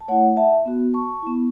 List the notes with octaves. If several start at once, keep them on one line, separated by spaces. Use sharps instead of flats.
A5
A3 E4 C#5 F#5
F#5
E5 A5
B3 F#4
A5 C#6
B3 E4